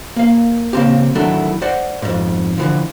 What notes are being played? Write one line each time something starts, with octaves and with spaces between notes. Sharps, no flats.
A#3 F5
C#3 A#3 C4 G4
D#3 F#3 A3 D4 E4 A4
C5 D5 F#5
F2 G#2
D3 E3 F3